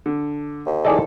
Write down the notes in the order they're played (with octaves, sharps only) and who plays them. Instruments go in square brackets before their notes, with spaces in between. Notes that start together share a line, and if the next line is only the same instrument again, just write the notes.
[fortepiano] D3
[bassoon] D#2
[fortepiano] D#3 E3 A4 [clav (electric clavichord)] G#4 D5 D#5